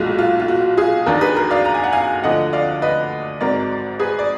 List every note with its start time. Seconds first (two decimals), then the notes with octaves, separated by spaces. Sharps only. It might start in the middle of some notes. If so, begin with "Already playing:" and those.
Already playing: B1 A#2 G#3 F#4
0.19 F4
0.40 F4
0.48 F#4
0.77 F4 G#4
1.06 D#2 D#3 F#3 D4 F#4 A#4
1.21 G#4 B4
1.36 F#4 A#4
1.51 D5 F5
1.65 A#5
1.75 G#5
1.84 F#5
1.93 F5 G#5
2.23 D2 D3 F3 D#5 F#5
2.53 D5 F5
2.82 B4 D#5
3.40 G#1 G#2 F#3 A#4 D5
3.99 G#4 B4
4.19 D5